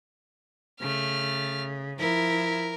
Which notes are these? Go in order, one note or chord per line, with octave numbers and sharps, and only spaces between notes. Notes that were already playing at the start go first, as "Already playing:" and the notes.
C#3 A3 F6
F3 E4 A#4